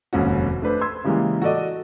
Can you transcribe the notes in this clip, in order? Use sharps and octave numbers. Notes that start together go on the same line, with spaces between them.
F1 D#2 G#2 C#4 F#4
A3 D4 B4 C5
C6 E6 G#6
C#3 E3 G3 G#3 A#3
F#4 A4 D5 D#5